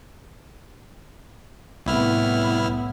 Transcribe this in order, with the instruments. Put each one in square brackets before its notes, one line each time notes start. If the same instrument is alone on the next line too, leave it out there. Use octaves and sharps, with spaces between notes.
[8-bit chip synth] C2 E4 F6 [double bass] A2 B3